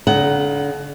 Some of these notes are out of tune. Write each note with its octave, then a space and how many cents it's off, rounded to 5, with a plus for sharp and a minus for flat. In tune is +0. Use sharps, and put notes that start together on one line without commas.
D3 -40 D#4 +0 F#5 +20